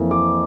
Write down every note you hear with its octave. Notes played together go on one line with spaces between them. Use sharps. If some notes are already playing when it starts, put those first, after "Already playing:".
Already playing: F2 E3 A#3
D6